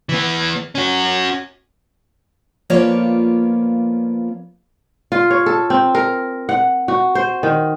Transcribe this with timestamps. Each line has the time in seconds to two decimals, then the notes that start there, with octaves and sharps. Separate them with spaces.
0.09 E3 B3
0.75 C#4 F#4
2.70 F3 A#3 B3 F4 C#5 D5
5.12 F4
5.31 C#5
5.46 A4
5.70 C4
5.95 A#4
6.49 F#5
6.88 F#4
7.15 C5
7.43 D#3